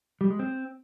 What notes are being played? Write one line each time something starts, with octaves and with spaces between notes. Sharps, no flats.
G3
G#3
C4